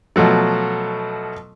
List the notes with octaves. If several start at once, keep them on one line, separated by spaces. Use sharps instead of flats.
B2 F3 F#3 A3